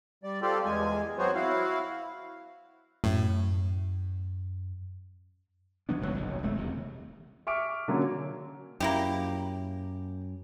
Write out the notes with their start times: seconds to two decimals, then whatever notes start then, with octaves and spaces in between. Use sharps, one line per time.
0.24 G3 D5
0.42 C4 F4 G4 A4 D5
0.65 E2 G#3 G#5
1.18 F#3 B3 C4 F#4 C5 C#5
1.35 E4 F#4 F5
3.04 F#2 A2
5.89 D#3 F#3 B3 D4
6.01 E1 C#2 G#2 F#3
6.14 F#1 B1 F#2 C#3
6.42 D#1 G#3 A3 C4
6.56 D#1 E2 C3
7.47 E5 C#6 D6 F6 D7
7.88 D3 F#3 A#3 C#4
8.80 F#2 A#3 E4 G4